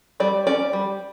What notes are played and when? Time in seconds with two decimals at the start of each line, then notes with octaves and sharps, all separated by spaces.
0.20 G3 D5
0.47 C#4 D5
0.73 G3